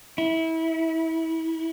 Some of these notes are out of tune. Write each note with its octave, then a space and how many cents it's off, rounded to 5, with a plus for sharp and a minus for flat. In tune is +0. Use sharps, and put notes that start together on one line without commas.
E4 -25